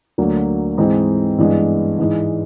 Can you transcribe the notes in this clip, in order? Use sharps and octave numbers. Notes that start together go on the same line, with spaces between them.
D2 D3 F#3 A#3
G#2 E3 G#3 C4 D#4
G2 E3 G#3 B3
G#2 E3 G#3